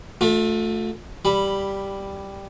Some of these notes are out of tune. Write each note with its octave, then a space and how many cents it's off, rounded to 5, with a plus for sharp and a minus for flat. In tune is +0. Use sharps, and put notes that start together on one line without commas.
A3 -5 F4 +45
G3 +0 B5 +0